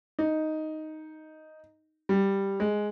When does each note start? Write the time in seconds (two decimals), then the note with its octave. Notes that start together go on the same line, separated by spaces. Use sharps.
0.19 D#4
2.09 G3
2.60 G#3